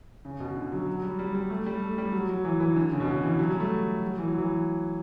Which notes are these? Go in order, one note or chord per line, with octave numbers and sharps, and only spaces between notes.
C#3
B2
D3
F#3
F#3
G3
G3
G3
A3
G3
A3
G3
F#3
F#3
E3
E3
D3
C#3
B2
C#3
E3
F#3
G3
A3
F#3
E3
F#3
E3